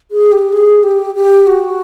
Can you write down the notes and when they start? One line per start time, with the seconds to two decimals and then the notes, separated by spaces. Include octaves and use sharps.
0.11 G#4
0.32 G4
0.53 G#4
0.83 G4
1.15 G4
1.47 F#4